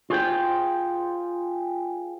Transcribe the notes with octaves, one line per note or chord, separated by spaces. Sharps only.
F4 G#4 C5 G5